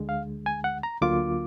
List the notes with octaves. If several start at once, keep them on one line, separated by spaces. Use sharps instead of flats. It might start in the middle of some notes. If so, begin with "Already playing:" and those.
Already playing: D2 D3 G#3
F5
G#5
F#5
A#5
D2 D3 F#3 A#3 F4 D6